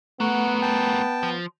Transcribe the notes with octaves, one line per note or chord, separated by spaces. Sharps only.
A3 B3 F#4 A#4 F#5 C#6
G5 A5
F3